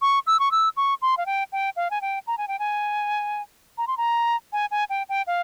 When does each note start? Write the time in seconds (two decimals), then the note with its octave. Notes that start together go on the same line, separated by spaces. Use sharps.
0.02 C#6
0.27 E6
0.40 C#6
0.51 E6
0.77 C#6
1.02 C6
1.17 F5
1.26 G5
1.52 G5
1.76 F5
1.91 G#5
2.01 G5
2.27 A#5
2.38 G#5
2.48 G5
2.59 G#5
3.78 A#5
3.87 C6
3.97 A#5
4.53 G#5
4.71 G#5
4.90 G5
5.09 G5
5.27 F5